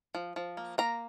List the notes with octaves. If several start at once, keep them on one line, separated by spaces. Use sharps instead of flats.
F3
F3
A#3
A#3 A#5